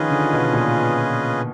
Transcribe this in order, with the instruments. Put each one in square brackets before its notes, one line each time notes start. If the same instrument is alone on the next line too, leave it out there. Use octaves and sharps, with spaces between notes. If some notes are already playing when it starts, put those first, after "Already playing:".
Already playing: [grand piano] D#3 F3 [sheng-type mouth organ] C#4 F4 G#4 B4 D#5
[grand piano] D3
B2
A#2